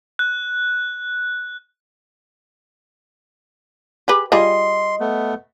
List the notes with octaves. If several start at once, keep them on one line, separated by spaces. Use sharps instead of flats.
F#6
G4 G#4 B4
G3 F4 G#4 D#5 C6
A3 B3